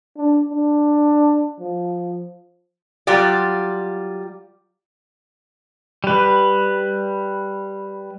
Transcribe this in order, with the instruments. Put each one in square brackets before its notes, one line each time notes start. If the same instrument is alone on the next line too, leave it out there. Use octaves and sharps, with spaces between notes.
[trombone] D4
D4
F3
[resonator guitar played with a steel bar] F#3 G3 F4 G4 D5
[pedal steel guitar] G3 B4